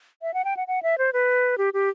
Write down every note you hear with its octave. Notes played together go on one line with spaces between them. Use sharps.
E5
F#5
G5
F#5
F#5
E5
C5
B4
G4
G4